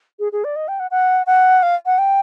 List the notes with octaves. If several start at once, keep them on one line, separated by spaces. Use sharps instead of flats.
G#4
G#4
D5
D#5
G5
F#5
F#5
F#5
F5
F#5
G5